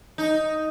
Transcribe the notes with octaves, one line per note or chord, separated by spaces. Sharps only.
D#4